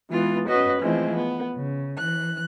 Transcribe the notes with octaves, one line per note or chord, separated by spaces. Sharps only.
E3 G#3 B3 F4
C#4 F#4 B4 D#5
E3 F3 G#3 A3 C4 E4
B3
C#3
E3 F#6